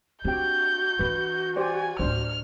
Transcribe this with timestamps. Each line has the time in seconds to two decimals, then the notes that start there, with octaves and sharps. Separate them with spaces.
0.25 C4 D4 F#4 G4 G5 G6
0.99 E3 D4 B4
1.56 G4 C5 D5 G#5
1.99 D2 A2 D4 C5 F6